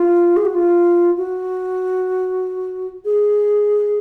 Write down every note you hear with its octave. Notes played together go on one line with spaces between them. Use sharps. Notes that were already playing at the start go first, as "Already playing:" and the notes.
Already playing: F4
G#4
F#4
F4
F#4
G#4